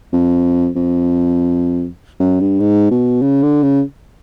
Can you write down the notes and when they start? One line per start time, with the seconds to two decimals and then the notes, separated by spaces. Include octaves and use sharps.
0.13 F2
0.76 F2
2.20 F#2
2.40 G2
2.60 G#2
2.91 B2
3.22 C#3
3.43 D3
3.63 C#3